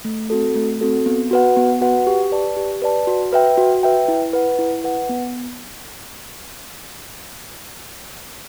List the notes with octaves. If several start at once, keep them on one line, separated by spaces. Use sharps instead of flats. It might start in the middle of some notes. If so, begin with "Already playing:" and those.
A3
C4 F#4 A4
A3
C4 F#4 A4
B3
F#4 B4 F#5
B3
F#4 B4 F#5
G4
B4 D5 A5
G4
B4 D5 A5
F#4
B4 E5 G5
F#4
B4 E5 G5
E4
B4 F#5
E4
B4 F#5
B3